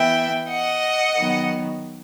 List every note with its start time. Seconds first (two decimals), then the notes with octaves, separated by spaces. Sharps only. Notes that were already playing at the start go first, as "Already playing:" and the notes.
Already playing: E3 B3 E5 G5
0.48 D#5 F#5
1.15 D#3 F#3 B3